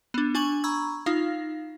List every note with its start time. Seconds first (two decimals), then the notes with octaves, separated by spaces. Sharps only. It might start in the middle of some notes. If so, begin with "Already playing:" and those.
0.14 B3 D4
0.35 D4 G#5 C#6 F#7
0.64 A#5 B5 C#6 E6 G#6
1.06 D#4 F4 F5